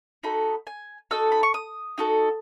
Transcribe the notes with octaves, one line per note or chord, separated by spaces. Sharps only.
D#4 F#4 A4 B5
G#5
D#4 F#4 A4 E6
B5
C#6
D#6
D#4 F#4 A4